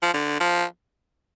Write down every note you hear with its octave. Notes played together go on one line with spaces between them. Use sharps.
F3
D3
F3